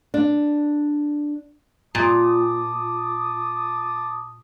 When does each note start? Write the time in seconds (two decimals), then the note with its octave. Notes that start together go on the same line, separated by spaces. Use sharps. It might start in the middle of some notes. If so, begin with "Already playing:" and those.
0.14 D4
1.95 A#2 A5 D6 D#6